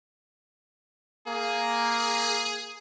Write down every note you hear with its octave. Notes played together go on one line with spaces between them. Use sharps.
A#3 G#4